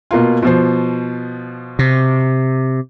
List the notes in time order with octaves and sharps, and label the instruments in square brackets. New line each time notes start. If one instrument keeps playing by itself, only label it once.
[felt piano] B2 A#3 F4
B2 F3 C5
[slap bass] C3